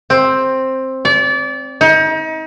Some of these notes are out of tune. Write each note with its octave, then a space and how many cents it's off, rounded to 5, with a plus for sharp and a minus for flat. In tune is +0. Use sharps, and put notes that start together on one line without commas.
C4 +10
D5 -30
D#4 +35